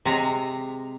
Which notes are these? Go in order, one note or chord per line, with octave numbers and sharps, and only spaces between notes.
C3 G#3 A#5